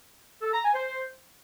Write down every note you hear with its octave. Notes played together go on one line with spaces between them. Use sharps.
A4
A#5
G#5
C5